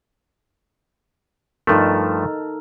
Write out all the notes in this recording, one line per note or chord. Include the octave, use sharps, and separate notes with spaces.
G2 F3 A3 D#4 A4 A#4